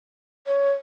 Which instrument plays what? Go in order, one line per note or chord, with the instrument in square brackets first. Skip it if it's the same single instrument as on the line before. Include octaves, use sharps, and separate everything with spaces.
[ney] C#5